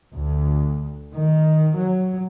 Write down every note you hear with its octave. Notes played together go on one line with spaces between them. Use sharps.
D2
D#3
F#3